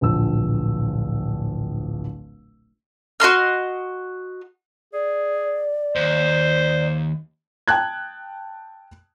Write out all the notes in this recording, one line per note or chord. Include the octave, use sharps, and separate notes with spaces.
D1 A#1 F3 E6
F#4 D#5 C6 F6
G#4 D5
D#2 C5
G5 A5 F#6 G#6